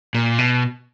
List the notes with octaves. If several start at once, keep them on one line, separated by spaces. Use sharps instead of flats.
A#2
B2